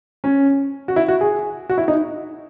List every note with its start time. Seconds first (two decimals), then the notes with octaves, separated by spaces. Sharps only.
0.24 C#4
0.88 F#4
0.96 E4
1.08 F#4
1.21 G#4
1.69 F#4
1.78 E4
1.88 D#4